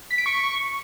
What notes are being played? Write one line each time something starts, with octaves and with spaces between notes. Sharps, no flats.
B6
D7
C#6